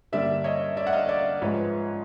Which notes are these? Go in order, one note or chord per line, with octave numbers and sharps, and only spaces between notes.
G2 D3 G3 A#3 D5 E5
C#5 D#5
D5 E5
F#5
D#5 F5
D5 E5
G#2 F3 G#3 B4 C#5